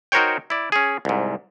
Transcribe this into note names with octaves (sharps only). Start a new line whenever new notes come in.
D#4 F#4 A#4 C5 C#5 G5
E4 D5
C#4 G#4
C2 G#2